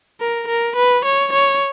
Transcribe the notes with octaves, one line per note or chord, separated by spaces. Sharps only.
A#4
A#4
B4
C#5
C#5